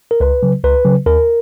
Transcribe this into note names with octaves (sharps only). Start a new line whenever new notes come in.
A#4
C#2 B4
C#3 F#3
C#2 B4
C#3 F#3
D#2 A#4